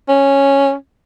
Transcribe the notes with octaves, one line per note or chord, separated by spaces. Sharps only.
C#4